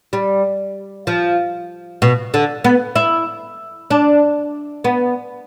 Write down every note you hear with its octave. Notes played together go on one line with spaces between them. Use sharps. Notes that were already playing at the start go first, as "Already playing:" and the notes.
G3
F3
B2
D3
B3
E4
D4
B3